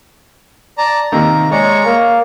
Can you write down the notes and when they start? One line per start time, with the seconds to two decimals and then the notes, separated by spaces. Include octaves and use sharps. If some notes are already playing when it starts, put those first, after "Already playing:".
0.78 D5 A5 A#5
1.12 C3 D#3 A#3 A#5
1.52 G#3 C#5 D5 A#5 C#6
1.85 A#3